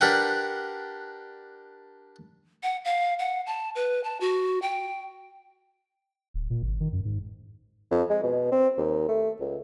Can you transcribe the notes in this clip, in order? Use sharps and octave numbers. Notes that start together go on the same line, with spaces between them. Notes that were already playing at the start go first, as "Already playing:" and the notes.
D4 G4 A#4 B4 F#5 G5
F#5
F5
F#5
A5
B4
A5
F#4
G5
D1
A#2
G#1
D#3
F#2
G#2
F2
G#3
B2
C4
D#2
A3
C#2